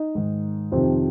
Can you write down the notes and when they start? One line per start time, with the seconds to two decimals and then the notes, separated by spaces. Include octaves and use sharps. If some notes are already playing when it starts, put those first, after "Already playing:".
Already playing: D#4 D#5
0.15 G#2 D#3
0.72 F2 C3 D#3 C4 C5